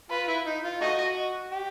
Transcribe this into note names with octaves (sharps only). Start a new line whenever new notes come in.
F4 B4
E4
D#4
F4
A3 D#4 F#4 D#5
G4